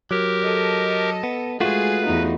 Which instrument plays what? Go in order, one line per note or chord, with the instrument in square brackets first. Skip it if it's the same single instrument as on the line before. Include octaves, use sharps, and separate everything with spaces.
[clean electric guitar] F#3 [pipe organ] G4 A#4
[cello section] A4 D#5
[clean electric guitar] B3
[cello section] G#3 G#4 [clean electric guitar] A3 F4 F#4 [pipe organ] B4
[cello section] E2 B3 D#4